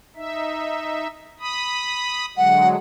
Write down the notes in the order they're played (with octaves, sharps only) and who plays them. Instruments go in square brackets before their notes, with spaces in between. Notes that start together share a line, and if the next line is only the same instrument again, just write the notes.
[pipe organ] D#4 E5
B5 D#6
[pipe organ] D3 F#3 G#3 [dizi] F#5